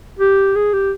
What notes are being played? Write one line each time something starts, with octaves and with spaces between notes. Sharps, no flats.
G4
G#4
G4